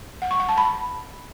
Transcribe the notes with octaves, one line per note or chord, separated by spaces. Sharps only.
F#5
C#6
F#5
A5
B5